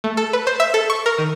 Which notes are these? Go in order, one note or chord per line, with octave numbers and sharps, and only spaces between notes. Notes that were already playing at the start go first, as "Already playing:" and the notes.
A3
A4
B4
C5
E5
A4
C#6
A#4
D#3